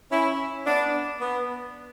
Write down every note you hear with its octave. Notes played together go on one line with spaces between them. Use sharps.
C#4 E4
B3 D4
B3